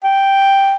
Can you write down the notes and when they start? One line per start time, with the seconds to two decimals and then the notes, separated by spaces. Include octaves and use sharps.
0.04 G5